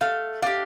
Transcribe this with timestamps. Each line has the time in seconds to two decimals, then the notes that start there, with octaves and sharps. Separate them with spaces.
0.01 A3 F5
0.42 D4 G4 F5